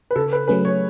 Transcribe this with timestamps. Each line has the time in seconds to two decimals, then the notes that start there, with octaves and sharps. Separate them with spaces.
0.11 B4
0.16 C#3 A4
0.33 B4
0.48 F#3 A3 C#4 G#4 B4
0.65 C#5